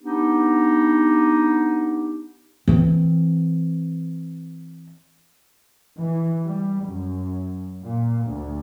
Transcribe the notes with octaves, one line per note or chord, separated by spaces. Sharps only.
B3 D4 D#4 G4
E3 C4
E3
G3
F#2
A#2
D2